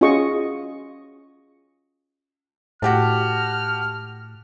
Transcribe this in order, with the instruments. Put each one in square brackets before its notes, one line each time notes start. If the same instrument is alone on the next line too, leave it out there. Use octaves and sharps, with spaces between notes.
[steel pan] C#4 F4 F#4 G#4 D#5 C#6
[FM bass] A2 [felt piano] F#4 G4 A5 [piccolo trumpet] F6